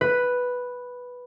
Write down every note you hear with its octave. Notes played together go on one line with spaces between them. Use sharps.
B4